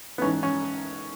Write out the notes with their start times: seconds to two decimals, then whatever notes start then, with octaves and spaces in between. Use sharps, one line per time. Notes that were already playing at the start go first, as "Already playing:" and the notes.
0.18 B3
0.22 A1 G#2 C#4
0.43 C#4